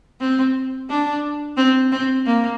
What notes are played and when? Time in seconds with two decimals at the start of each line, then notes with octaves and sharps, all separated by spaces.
0.21 C4
0.90 D4
1.57 C4
1.92 C4
2.26 A#3